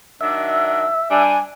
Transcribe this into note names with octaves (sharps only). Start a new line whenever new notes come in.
D#3 F#3 D4 E5
G3 D4 G#5